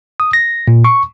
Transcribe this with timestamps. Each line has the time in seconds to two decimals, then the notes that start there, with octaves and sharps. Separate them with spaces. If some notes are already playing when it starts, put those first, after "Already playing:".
0.20 D#6
0.33 A#6
0.68 A#2
0.84 C#6